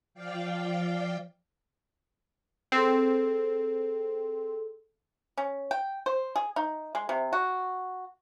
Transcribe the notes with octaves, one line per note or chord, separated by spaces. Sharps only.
F3 D5 F5 G5
C4 G#4 A4
C#4
G5
C5
G#4
D#4
G#3
C3
F#4